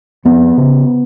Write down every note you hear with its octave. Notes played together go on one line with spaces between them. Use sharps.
F2 B3
C#3